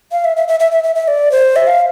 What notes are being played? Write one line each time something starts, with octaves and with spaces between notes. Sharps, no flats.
F5
E5
E5
E5
E5
E5
E5
E5
D5
C5
E5
F5